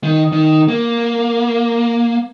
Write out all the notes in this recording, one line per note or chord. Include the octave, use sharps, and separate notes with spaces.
D#3
D#3
A#3